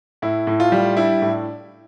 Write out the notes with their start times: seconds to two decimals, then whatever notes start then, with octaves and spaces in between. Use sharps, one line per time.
0.22 A2 E4
0.47 A2
0.60 F4
0.72 G3
0.97 D4 E4
1.22 A2